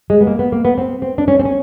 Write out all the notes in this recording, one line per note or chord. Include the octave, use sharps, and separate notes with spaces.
G#3
B3
A#3
B3
A#3
B3
C4
C4
D4
C#4
C4
C#4